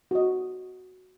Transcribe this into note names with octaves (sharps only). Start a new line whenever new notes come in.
F#4 D#5